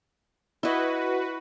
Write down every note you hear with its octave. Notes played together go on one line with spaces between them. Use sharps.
E4 F#4 B4 D#5